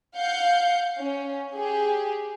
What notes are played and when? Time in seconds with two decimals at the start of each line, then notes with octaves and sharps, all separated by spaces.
0.16 F5 F#5 G6 C#7
1.00 C#4
1.56 G4 G#4